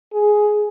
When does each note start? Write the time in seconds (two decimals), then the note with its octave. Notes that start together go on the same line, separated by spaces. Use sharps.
0.13 G#4